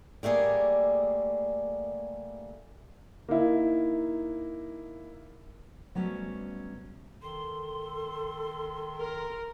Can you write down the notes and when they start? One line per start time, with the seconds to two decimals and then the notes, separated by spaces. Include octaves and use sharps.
0.23 G3 A3 A#3 G#4 D5
3.29 A#3 D#4 E4
5.95 C3 F#3 G3 A3 B3 C#4
7.22 D#3 A4 C6
8.99 A#4